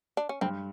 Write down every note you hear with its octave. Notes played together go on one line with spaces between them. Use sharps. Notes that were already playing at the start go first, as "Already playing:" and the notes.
D4
C#4
G2 C4